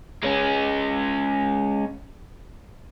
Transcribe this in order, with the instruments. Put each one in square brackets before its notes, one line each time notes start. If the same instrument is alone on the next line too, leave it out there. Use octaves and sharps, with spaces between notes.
[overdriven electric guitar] G#3 C#4